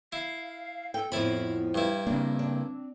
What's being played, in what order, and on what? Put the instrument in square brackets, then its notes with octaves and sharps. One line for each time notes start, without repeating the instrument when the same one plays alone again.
[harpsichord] E4 [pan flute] F5
[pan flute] A4 [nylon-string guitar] G5
[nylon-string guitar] F2 A2 F3 [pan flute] B3 [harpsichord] E4 B5
[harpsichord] G2 E4
[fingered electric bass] C#3 A#3 [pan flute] C4 [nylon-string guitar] D4
[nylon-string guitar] D4